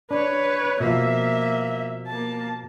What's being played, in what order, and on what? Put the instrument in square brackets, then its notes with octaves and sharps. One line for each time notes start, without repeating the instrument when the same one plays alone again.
[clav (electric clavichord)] D4 [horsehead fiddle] B4 C#5
[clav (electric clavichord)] B2 F3 [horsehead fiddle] A#3 E5
[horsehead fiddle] A#3 A5